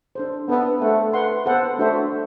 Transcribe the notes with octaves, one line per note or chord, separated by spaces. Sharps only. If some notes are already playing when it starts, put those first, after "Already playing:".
D4 A4 C5
B3 D4 A4 E5
A3 A4 C5 F#5
B4 F#5 C6
B3 A4 C5 F#5
A3 D4 F#4 C5 E5